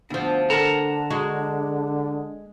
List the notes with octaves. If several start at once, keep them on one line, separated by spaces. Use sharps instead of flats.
D2 F3 B3 D4
D3 D4 A4 A#4 F#5 A5 A#5
G#3 F#4